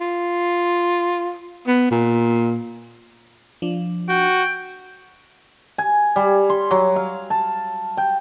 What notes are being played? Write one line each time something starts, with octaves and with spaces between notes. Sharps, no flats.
F4
B3
A#2
F3 D4
F#4 G5
G#5
G3
C6
F#3
F5
A5
G5